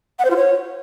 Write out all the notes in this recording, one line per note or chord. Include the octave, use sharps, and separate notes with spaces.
F#5
C5
F4
C#5